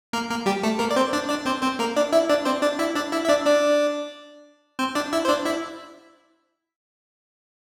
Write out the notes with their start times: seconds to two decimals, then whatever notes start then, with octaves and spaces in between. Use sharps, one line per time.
0.13 A#3 A#4
0.30 A#3 A#4
0.46 G3 G4
0.63 A3 A4
0.79 A#3 A#4
0.91 D5
0.96 C4 C5
1.13 D4 D5
1.29 D4 D5
1.46 C4 C5
1.63 C4 C5
1.79 A#3 A#4
1.96 D4 D5
2.12 E4 E5
2.29 D4 D5
2.45 C4 C5
2.62 D4 D5
2.79 E4 E5
2.95 D4 D5
3.12 E4 E5
3.25 E5
3.29 D4 D5
3.46 D4 D5
4.79 C4 C5
4.95 D4 D5
5.13 E4 E5
5.25 C5
5.28 D4 D5
5.45 E4 E5